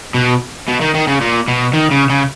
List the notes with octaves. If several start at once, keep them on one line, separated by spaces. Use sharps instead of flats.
B2
B2
D#3
D#3
C#3
A#2
B2
D#3
C#3
C#3